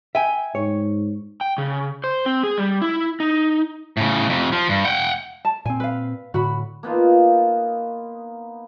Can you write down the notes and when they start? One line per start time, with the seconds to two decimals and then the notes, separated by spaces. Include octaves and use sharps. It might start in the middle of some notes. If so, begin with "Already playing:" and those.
0.15 E5 G5 G#5
0.55 G#2 C#5
1.41 G5
1.58 C#3
2.04 C5
2.26 C4
2.43 G#4
2.57 G3
2.81 E4
3.20 D#4
3.97 A2 C#3
4.29 F2 C3
4.52 F3
4.69 G2
4.85 F#5 G5
5.45 A5
5.65 A#2 C4 G#5
5.80 B4 F5
6.34 A2 D3 F#4 B5
6.83 A#3 B3 D#4 F4